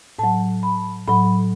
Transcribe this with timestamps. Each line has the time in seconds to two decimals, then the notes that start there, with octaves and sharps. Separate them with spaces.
0.19 A2 F#3 A5
0.63 B5
1.07 A2 F#3 B5